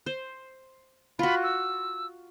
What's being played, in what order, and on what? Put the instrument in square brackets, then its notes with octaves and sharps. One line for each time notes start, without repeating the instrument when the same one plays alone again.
[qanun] C5
[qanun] F4 F#4 [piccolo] B5
[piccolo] E6